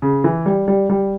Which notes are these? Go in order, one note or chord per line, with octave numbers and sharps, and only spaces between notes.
C#3
E3
G3
G3
G3